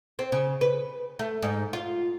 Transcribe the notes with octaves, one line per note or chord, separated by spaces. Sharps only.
C4
C#3
B4
A3
G#2
F4